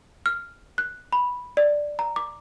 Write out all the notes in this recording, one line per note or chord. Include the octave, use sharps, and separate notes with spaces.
F6
F#6
B5
D5
A#5
D6